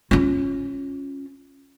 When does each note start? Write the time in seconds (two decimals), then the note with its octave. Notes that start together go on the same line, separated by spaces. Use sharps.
0.11 C#4 F4